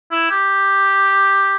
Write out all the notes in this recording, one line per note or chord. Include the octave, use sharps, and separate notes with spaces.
E4
G4